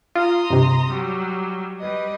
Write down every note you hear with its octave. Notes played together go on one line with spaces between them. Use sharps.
F4 A#5 C6 D#6
G2 C3
F#3 G3
G3 B4 D#5